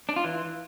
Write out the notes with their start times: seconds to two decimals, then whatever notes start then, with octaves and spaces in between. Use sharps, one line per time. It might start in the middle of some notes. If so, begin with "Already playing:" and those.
0.09 D4
0.16 F4
0.24 E3